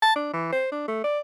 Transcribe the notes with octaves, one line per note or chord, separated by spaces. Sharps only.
A5
D4
E3
C5
D4
A3
D5